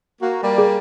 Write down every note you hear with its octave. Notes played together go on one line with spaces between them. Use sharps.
A#3 F#4
G3 A#3 D5
G#4